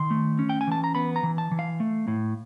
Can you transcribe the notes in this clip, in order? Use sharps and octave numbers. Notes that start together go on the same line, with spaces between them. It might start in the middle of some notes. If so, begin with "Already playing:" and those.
Already playing: D#3 C6
A3
C#4
G5
G#5
E3 A5
A#5
B3 B5
A#5
E3
A5
E3
F5
A3
A2